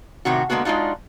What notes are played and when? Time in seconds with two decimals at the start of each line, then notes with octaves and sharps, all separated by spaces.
0.25 A2 C3 D#3 F#4
0.50 D3 G#3 A#3 B3 F#4
0.65 G#3 D4 D#4 F4 F#4